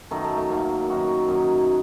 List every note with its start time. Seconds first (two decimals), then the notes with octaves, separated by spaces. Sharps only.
0.11 F#2 D#3 F#3 A3
0.24 A3
0.37 A3
0.50 F#2 D#3 F#3 A#3
0.90 F#2 D#3 F#3 F#4
1.28 F#2 D#3 F#3